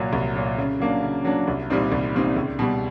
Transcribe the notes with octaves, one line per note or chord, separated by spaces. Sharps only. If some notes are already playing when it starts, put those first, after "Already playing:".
Already playing: C2 A#2 F#3
C2
A#2 F#3
C#3
F#3 A#3 D4
C#3
F#3 A#3 D4
C2
A#2 G3 C4 D#4
C2
A#2 G3 C4 D#4
C#2
B2 G3